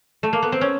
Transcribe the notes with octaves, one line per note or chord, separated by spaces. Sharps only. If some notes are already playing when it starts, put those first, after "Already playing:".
A3
A#3
B3
C4
C#4